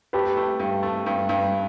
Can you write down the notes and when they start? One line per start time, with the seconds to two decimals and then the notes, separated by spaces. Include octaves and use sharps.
0.13 A3 G4 B4
0.37 A3
0.60 G2
0.83 A3
1.06 G2
1.29 G2